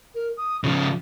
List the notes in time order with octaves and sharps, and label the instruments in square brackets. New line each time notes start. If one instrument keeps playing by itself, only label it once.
[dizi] A#4
D#6
[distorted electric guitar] C#3 F3 [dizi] F4